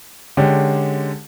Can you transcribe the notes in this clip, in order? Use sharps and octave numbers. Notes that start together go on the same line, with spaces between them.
D3 G#3 C#4 G4